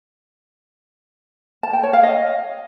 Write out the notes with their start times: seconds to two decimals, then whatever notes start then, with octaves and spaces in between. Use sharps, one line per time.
1.63 A5
1.73 G5
1.83 C#5
1.93 F5
2.03 D#5